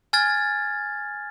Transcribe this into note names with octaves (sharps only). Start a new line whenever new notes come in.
G#5 F6 G#6 A6